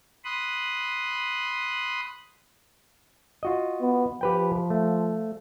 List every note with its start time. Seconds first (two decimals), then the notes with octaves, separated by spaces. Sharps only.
0.24 B5 C6 D#6 F#6
3.43 F4 F#4 D#5
3.81 B3
4.21 F3 G4 B4 G5
4.70 A3